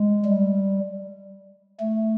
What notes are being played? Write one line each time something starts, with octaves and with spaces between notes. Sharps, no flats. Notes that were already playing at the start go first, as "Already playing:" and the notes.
Already playing: G#3
G3
A3